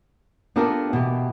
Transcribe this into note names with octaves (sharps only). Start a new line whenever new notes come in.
B3 D4 F4 G4 A4 A#4
B2 E3 G4